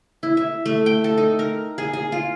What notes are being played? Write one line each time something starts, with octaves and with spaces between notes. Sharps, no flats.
E4
E5
A3
G5
A4
D#4
A#4
G#4
G#4
F4